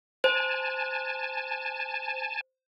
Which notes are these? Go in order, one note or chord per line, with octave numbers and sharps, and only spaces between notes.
C5 G#5 A5